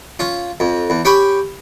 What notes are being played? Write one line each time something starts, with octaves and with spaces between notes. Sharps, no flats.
C#4 F4
F2
E2
C#4 G4 G5 B5 C#6